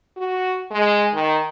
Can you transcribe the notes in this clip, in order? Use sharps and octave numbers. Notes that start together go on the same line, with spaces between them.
F#4
G#3
D#3